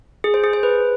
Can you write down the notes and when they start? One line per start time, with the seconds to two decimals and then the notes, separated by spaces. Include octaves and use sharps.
0.24 G#4
0.34 C5
0.44 G#4
0.53 C5
0.63 B4